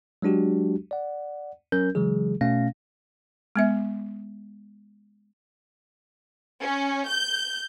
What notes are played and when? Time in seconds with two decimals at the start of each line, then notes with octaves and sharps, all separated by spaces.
0.22 F#3 G#3 D4 F#4 G4
0.91 D5 F#5
1.72 F#3 C#4 A#4 G6
1.95 C#3 E3 F#3 G#3 G#4
2.41 B2 A3 C#4 F5 A#6
3.56 G#3 B3 E5
6.62 C#4
7.08 G6